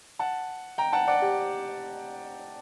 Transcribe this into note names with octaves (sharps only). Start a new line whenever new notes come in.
F#5 A5
G5 A#5
F#5 A5
D5 F#5
G4